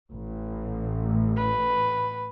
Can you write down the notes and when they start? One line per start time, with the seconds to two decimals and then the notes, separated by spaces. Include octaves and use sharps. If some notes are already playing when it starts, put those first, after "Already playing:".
0.12 A1
1.36 B4